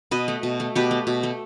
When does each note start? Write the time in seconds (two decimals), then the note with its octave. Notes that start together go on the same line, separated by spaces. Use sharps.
0.11 B2 B4 D#5
0.28 A3
0.43 B2
0.60 A3
0.75 B2 G4 B4
0.91 A3
1.07 B2
1.23 A3